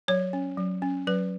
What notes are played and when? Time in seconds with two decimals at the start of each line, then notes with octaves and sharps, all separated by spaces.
0.08 F#3 C#5
0.33 C#4
0.58 F#3
0.82 C#4
1.07 F#3 B4